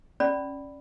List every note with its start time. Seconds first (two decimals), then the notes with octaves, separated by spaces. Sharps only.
0.20 C#4 D5 B5